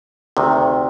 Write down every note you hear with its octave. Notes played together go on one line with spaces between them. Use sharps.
D2 C3 D#3